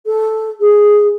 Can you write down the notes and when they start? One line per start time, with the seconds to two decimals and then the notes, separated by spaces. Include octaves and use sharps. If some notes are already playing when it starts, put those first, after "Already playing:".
0.06 A4
0.60 G#4